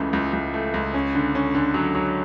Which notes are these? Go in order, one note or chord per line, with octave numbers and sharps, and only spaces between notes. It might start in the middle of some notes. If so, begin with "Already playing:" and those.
Already playing: C#2 C#3 E3 A3
C#2
C#2
A3
C#2
C#4
D3
C#4
D3
F#3
F#3